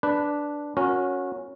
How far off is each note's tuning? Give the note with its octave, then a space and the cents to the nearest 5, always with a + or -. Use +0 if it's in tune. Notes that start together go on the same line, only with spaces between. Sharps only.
D4 +0 B4 +0
C#4 +0 F#4 -25 A#4 +0